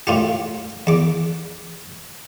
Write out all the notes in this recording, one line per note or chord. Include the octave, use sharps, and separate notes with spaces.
A2 F4 G4
E2 D6